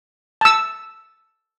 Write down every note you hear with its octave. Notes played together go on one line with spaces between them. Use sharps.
A5 E6